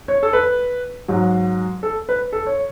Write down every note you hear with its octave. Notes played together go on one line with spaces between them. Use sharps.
C#5
A4
B4
G#2 F#3
A4
B4
A4
C#5